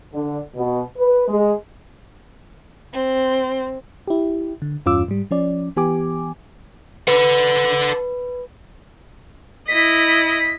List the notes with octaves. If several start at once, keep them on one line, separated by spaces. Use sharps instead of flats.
D3
B2
B4
G#3
C4
E4 G4
D3
E2 G2 C#4 F4 D6 E6
G#2 G3
F3 C#4 D5
E3 B3 G4 G#5 D6
A4 B4 F#5
E4 D#5 B6